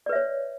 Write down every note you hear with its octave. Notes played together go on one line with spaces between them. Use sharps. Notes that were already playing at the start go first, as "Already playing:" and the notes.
B4 C#5 D5 E5